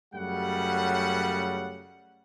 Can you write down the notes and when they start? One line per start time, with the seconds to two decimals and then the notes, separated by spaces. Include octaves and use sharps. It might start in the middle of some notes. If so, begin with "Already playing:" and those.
0.14 F#2 C#3 G3 A3 F#5